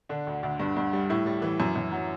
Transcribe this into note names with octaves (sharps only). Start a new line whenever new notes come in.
D3 D4
D2
D2
G2
G2
G3
A2 E4
G3
E3
F#2
F#2
F#3